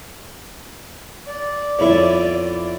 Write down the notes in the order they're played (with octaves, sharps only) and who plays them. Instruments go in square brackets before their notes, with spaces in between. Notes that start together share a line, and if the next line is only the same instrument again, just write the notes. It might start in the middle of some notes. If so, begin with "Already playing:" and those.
[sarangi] D5
[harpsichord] F2 B2 E5 [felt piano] E4 C#5